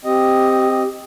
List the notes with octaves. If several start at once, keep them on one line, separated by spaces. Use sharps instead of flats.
C4 G4 D#5